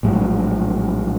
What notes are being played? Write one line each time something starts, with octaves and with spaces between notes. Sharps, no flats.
A#1 A2 F#3 G#3